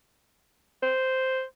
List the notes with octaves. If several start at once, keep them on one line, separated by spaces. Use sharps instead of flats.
C5